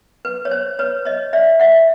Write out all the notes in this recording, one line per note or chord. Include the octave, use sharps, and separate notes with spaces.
B4
C#5
C5
B4 C#5
C#5 D#5
D5 E5
E5 F#5